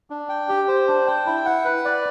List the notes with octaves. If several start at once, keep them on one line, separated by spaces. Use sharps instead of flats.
D4
G5
G4
C5
D4
G5
E4
F#5
B4
D5